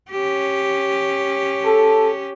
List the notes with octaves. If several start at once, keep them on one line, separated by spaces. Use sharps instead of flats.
C#4 G4
A4